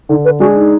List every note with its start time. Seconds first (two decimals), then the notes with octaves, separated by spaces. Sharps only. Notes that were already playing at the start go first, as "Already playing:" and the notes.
0.09 D3 D#4
0.25 B4
0.40 G#3 D4 F#4 G#4
0.56 D#4